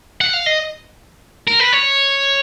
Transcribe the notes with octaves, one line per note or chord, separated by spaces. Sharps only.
F#5
F5
D#5
A#4
B4
C#5